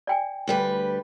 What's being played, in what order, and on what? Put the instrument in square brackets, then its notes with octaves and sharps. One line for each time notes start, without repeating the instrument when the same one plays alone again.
[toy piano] D5 G5 G#5
[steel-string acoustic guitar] D2 G3 B4